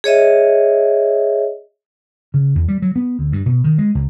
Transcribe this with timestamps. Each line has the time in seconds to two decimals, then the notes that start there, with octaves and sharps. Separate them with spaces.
0.04 G#4 C#5 D#5 E5
2.34 C#3
2.55 E2
2.68 G3
2.82 F#3
2.96 B3
3.19 D2
3.32 G2
3.46 B2
3.64 D#3
3.78 G#3
3.95 C#2